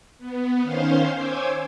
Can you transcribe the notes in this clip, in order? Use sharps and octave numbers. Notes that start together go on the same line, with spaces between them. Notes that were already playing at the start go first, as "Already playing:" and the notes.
B3
D#3 C#4 C5 F5 C6
C5 C#5 G#5 D6 E6 G#6